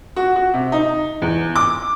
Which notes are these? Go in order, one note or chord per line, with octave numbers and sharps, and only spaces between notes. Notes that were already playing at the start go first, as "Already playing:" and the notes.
F#4
F#4
C3
D#4
E2
D6